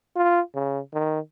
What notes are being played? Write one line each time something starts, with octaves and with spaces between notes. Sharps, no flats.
F4
C#3
D#3